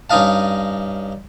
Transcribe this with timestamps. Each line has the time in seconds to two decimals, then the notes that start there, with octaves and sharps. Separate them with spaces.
0.10 G2 C#4 D#4 D#5 F5 A5